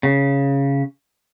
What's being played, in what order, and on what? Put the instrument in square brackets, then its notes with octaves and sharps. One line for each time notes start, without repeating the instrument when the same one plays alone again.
[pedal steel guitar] C#3